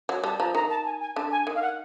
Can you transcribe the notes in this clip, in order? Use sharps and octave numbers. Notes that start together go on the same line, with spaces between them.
F#3
G3 A5
F3 A#5
D#3 A#5
A5
G#5
G#5
D3 A5
G#5
D#3
F5
F#5